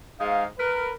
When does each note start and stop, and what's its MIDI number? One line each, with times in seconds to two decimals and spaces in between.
0.20 0.44 44
0.20 0.44 56
0.20 0.44 63
0.20 0.44 77
0.58 0.91 70
0.58 0.91 71